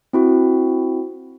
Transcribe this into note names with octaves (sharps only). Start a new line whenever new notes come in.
C4 E4 F#4